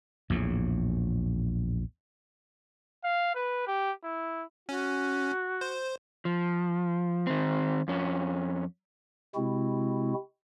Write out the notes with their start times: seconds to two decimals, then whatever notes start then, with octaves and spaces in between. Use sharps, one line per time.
0.30 A#1 E2 A2
3.04 F5
3.35 B4
3.67 G4
4.04 E4
4.69 C#4 F#4
5.61 C5
6.25 F3
7.27 D#3 C4
7.88 F2 C#4
9.35 C3 G#3 C4 E4 F#4